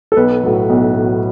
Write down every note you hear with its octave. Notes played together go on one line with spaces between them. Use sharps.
A4
B1 B4
A2 F#3
B1
A2 F#3